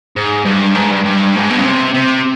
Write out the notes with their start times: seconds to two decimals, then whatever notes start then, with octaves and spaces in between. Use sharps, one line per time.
0.16 G#2
0.45 G2
0.75 G#2
0.91 G2
1.05 G2
1.36 G#2
1.51 B2
1.58 C#3
1.65 C3
1.95 C3